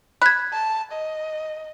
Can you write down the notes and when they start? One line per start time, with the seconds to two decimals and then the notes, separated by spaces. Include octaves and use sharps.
0.22 B5 F#6 G#6
0.53 A5
0.92 D#5